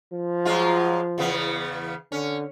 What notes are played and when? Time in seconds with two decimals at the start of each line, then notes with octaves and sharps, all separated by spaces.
0.13 F3
0.45 F#3 G#3 F4
1.18 E2 C#3 B3
2.12 D3 C#4